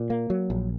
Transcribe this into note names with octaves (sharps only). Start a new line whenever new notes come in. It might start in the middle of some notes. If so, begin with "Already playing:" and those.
Already playing: A#2
A#3
F#3
A#1